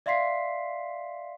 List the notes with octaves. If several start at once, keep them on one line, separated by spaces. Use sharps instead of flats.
D5 E5 F5 C6 B6 C7